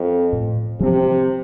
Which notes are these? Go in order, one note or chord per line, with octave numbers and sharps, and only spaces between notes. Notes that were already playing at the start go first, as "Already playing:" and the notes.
Already playing: F2
A2
C3 F3 C4